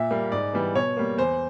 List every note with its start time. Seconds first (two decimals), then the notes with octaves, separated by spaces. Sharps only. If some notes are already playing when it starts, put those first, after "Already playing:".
Already playing: A#2 E5
0.11 G3 A#3
0.32 G#2 D5
0.53 E3 G3 B3
0.75 B2 C#5
0.97 G3 A#3
1.17 E2 C5